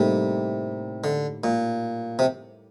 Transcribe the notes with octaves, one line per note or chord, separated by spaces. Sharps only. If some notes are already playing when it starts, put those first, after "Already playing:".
Already playing: A2 C3 G3 A#3 D#4 A4
D3
A#2
C3